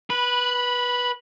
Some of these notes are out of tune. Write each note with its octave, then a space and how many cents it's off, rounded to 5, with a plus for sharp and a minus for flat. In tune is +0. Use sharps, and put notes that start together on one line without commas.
B4 -15 B5 +0